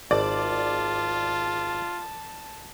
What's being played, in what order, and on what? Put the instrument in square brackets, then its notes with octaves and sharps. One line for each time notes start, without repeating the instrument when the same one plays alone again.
[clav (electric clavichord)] G#1 [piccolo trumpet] F4 [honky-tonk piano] D5 [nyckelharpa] A5